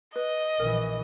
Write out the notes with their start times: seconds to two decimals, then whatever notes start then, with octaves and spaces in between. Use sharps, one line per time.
0.16 B4 D#5
0.60 A#1 E3 A#4